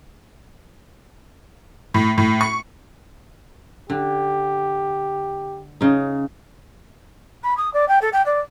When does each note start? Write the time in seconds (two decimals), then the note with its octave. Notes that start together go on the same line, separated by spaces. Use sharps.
1.94 A2
2.18 A2
2.41 C#6
3.90 D3 G4
5.81 C#3 D#4
7.43 B5
7.57 D#6
7.73 D5
7.88 G5
8.01 A4
8.12 G5
8.26 D5